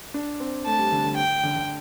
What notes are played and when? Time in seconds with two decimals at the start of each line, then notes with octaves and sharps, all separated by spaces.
0.14 D4
0.40 C4
0.66 A3 A5
0.79 G3
0.92 D3
1.04 D3
1.17 G5
1.43 D3
1.56 D3